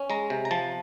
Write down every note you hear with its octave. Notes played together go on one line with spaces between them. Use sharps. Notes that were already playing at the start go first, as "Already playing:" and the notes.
Already playing: C#4
G#3 A#5
C3
A#5
F3 A5